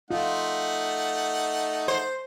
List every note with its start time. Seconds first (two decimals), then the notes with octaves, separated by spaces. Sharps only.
0.11 A3 D#4 F4 F#5
1.88 C5